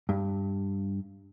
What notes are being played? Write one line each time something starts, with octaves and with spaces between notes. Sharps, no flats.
G2